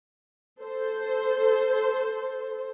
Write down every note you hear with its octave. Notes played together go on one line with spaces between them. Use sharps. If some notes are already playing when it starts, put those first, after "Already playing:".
A4 C5